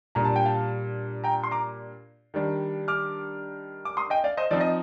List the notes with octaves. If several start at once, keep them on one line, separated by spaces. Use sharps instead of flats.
A#2 G3 D4 A#5
A5
G5
F5 A5
G5 A#5
C6
A#5 D6
D#3 G3 D4
D6 F6
D6
C6 D#6
D#5 G5
D5 F5
C5 D#5
F3 C4 D#4 D5
D#5